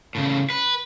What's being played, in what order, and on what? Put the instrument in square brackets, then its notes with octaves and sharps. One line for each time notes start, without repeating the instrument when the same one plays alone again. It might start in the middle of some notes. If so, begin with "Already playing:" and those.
[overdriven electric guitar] A2 C#3
B4